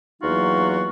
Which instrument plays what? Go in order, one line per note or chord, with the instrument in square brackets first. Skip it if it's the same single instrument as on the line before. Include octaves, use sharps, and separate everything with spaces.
[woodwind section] E2 F#3 A#3 D#4 F4 F#4